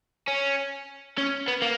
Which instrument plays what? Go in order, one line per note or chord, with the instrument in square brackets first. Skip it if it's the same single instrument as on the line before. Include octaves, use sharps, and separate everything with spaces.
[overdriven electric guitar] C#4
C#4
B3
A#3